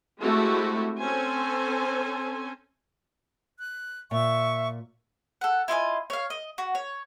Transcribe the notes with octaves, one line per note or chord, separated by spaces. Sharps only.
G#3 A3 C4 E4 F#4 G4
C4 C#4 A4 C5 G#5
F#6
A#2 E5 C#6
A4 F#5
E4 F4 D#5 G#5
C#5 F5
D#5
F#4
C#5